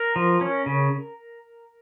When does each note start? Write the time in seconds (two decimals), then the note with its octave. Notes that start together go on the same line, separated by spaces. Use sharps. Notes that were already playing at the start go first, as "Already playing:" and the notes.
Already playing: A#4
0.16 F3
0.41 C#4
0.66 C#3